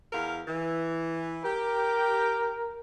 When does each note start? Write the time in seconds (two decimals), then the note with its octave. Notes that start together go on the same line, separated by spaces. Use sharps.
0.13 E2 A#4 F5
0.47 E3
1.45 G4 A#4